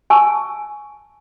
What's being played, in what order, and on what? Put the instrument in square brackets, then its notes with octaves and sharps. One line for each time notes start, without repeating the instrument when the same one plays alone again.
[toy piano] G#5 A5 C#6 E6